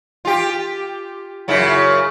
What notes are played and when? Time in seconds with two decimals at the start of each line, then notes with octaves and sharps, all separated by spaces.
0.25 F4 G4
1.48 F#2 C#3 E4